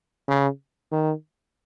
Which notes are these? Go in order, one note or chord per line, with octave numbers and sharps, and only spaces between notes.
C#3
D#3